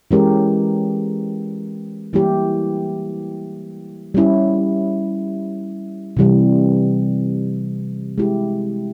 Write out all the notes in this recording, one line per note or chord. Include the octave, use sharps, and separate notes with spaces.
E3 G#3 C#4 G4 A#4
E3 G3 A#3 E4 G4
G3 C#4 E4
C3 E3 G3
G#3 E4 G4